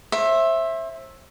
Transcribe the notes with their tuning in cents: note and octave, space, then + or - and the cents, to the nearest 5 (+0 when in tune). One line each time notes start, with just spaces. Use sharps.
C5 +35 E5 +0